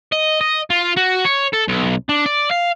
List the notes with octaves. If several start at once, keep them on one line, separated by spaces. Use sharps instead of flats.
D#5
D#5
F4
F#4
C#5
A4
B1
D4
D5
F5